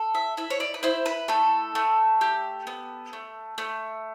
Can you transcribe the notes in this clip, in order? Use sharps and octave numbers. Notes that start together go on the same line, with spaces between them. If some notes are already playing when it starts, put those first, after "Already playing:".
Already playing: A4
E5
E4 E5
C#5
D5
B4
E4 C5
B4
A3 A4
A3
G4
B3
A3
A3